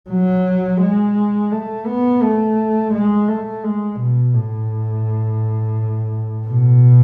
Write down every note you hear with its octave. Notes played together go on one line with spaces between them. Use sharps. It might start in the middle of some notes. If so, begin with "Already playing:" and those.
F#3
G#3
A3
B3
A3
G#3
A3
G#3
B2
A2
B2